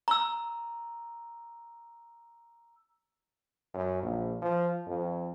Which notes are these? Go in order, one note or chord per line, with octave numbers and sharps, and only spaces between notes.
A#5 E6
F#2
A#1
F3
F2